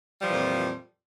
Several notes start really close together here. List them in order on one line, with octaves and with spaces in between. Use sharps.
G3 F3 E3 A#2 F2